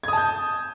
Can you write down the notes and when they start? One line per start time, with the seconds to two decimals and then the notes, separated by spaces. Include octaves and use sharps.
0.03 G#6
0.08 D#6
0.13 A5
0.18 G6